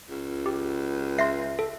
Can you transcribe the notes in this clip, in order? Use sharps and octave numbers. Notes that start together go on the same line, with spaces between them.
C#2
G4
E5 C6 A#6 C7
A4